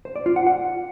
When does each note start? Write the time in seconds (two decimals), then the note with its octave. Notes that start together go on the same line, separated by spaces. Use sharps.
0.05 C5
0.16 D5
0.26 F4
0.36 F#5
0.47 F#5